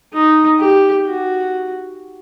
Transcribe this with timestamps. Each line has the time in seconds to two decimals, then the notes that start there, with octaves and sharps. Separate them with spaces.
0.14 D#4
0.59 G4
1.05 F#4